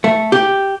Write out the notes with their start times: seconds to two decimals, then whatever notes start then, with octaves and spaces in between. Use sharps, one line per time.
0.04 A3
0.32 G4